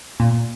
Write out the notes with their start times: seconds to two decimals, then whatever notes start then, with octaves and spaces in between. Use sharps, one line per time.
0.20 A#2